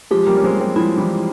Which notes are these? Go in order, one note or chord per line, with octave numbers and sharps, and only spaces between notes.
F3 G#3 G4
G3 A#3
C#4
G#3 C4
G#3 C4
F3 G#3 E4
E3 G3